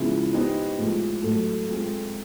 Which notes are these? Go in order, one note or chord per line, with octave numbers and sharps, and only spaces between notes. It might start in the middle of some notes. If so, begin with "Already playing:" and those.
Already playing: C#3 F3 G#3 B3 E4
B3 D#4 G4 C5 D#5
A2 F3 G#3
A2 F#3 A3
G#3 C4 F4 A4